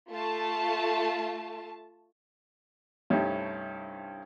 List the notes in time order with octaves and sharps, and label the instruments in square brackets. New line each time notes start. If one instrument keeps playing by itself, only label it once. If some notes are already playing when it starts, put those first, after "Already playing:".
[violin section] A3 F4 A5
[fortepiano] C2 G2 A3 C#4 D#4 G4